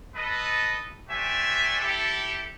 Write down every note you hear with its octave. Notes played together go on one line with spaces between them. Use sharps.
A4 B4 D#5
A3 D4 G4 C5 E5 G#5
E4 G4 A4